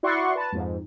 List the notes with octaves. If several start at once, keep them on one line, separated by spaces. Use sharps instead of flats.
E4 F#4 D5 F#5 C6 C#6
B4 A5
F2 G#2